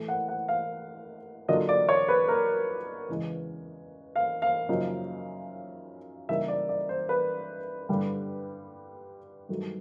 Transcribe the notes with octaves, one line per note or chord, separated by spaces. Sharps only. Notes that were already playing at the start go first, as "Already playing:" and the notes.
Already playing: A2 E3 A3
F#5
F#5
F5
D3 F#3 A#3 D4 F4 D#5
D5
C#5
B4
A#4
E2 C#3 E3 G#3
F5
F5
F#2 C#3 F3 A#3 D#4
C#3 E3 G3 A#3 D#4 E5
D5
D5
C5
B4
G2 D3 G3
G2 D#3 F#3 A3